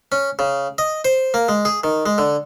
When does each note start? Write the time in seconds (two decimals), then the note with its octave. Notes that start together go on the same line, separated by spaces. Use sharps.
0.12 C#4
0.39 C#3
0.78 D#5
1.05 C5
1.34 A#3
1.48 G#3
1.65 G#4
1.84 D#3
2.06 G#3
2.18 D3